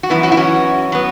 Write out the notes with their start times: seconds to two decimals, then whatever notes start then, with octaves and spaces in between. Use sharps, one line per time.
0.03 F#4
0.10 F#2 E3 B3 E4
0.23 C#4 F#4
0.32 E4
0.37 C#4 F#4
0.92 F#3 B3